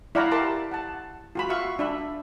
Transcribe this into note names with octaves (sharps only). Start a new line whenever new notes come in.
E4 D5 F5 F#5 A#5 B5
G4 A#4 A5 C6 D6
F#5 A5
F4 F#4 B5
F#4 E5 F5 C#6
D4 E5 B5